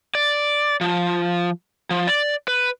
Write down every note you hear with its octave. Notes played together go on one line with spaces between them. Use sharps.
D5
F3
F3
D5
B4